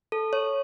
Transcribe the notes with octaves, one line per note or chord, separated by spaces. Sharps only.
A4
C#5